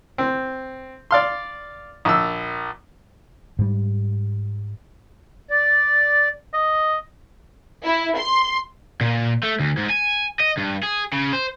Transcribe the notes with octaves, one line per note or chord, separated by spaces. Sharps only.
C4
D5 F5 C6
A#1 E6
G#2 G3
D5
D#5
E4
C6
A#2
A3
D2
G#2
G#5
D#5
G2
G#4
C#3
C5